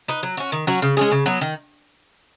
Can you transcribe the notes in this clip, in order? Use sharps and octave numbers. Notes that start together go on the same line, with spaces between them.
D#4 B4
F#3
C#4 F#4
D#3
F#3 C#4 F#4
C#3
G#3 C#4 G#4
C#3
F#3 B3
D#3